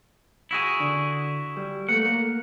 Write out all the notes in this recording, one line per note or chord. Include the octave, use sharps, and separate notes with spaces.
E4 F#4 G#4
D3
G3
A3 A#3 F#5
A#3